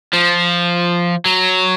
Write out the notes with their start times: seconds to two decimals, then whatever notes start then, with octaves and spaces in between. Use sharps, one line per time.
0.14 F3
1.26 F#3